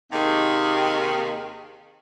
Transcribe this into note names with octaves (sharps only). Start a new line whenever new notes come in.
D#2 C3 D#3 G#4